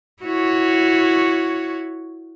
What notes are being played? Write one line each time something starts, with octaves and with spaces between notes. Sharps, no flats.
E4 F#4 C#5